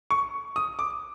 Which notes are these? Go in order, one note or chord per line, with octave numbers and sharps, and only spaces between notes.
C#6
D#6
D6